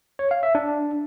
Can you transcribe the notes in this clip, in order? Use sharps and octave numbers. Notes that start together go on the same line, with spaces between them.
C#5
F5
E5
D4